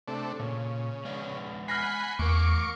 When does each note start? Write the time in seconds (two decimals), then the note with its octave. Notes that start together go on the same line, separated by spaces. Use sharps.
0.08 C3 A3 D4
0.40 A#2 C#3
1.05 G#3 B3 D5
1.68 F#5 G#5 B5 F6 A#6 C7
2.19 E2 A3 A#4 C#6 D6